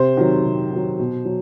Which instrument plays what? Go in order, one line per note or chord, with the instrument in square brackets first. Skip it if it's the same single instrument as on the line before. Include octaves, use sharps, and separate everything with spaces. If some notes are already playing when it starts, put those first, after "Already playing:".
Already playing: [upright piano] C3 C5
D#3 F#3
C3
D#3
F#3
B2
F#3